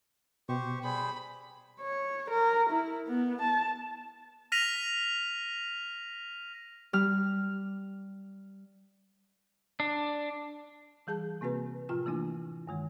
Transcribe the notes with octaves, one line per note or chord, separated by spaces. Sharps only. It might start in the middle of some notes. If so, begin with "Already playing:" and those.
B2 G4 C5 C#6
G3 G#4 C5 B5
C#5
A#4
E4
B3
A5
F6 A#6 B6 D#7 F7
G3 F6
D4
E3 G3 G#4 A5 G6
C3 A#3 C4 F#4 B4
A2 C3 F3 F4 G5 F6
E3 A3 A#3 D4 E4
G2 D#3 G#3